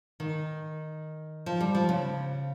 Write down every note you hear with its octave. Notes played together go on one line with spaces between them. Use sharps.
D#3
F3
G3
F3
C#3